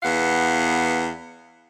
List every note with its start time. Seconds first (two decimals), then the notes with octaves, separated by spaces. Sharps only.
0.02 E2 B3 F5 F#5